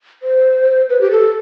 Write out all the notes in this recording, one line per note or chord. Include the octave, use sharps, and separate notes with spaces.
C5
B4
G4
A4